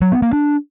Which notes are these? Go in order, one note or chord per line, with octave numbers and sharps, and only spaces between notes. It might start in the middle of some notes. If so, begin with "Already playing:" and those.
F#3
B3
A#3
D4